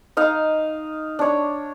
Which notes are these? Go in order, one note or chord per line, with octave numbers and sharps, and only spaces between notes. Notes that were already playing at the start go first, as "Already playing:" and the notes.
D#4 D#5 F5
D4 C#5